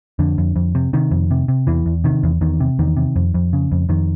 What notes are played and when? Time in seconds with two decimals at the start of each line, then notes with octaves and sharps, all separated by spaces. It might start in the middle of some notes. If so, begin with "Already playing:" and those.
0.19 F2 D3
0.38 F2
0.56 F2
0.75 C3
0.93 C3 D#3
1.11 F2
1.31 C3
1.48 C3
1.67 E2 E3
1.86 E2
2.04 C3 D#3
2.23 E2
2.41 E2 D#3
2.60 C3
2.79 E2 D#3
2.97 C3
3.16 F2
3.34 F2
3.53 C#3
3.72 F2
3.89 F2 D#3